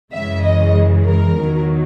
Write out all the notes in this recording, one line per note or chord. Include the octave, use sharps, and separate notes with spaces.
F#2 C#3 E3 G#3 E5
D#5
A#4
E2 D#3 F#3